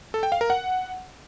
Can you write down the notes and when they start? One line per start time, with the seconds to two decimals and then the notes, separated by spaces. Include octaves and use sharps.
0.14 A4
0.23 G5
0.32 F5
0.41 A#4
0.50 F#5